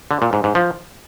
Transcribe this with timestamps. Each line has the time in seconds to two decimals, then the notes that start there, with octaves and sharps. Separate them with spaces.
0.11 D3
0.22 A#2
0.33 G#2
0.44 G#2
0.55 F3